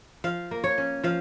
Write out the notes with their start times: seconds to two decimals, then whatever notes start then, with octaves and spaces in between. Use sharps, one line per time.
0.24 F3 F5
0.51 A#3
0.64 C#5
0.78 C#4
1.04 F3 F5